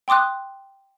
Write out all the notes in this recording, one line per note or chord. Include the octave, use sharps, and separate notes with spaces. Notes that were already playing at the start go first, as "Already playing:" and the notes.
G5 C6 D6 D#6 F#6